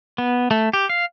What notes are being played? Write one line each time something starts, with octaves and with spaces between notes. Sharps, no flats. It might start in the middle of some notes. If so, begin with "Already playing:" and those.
B3
A3
G4
F5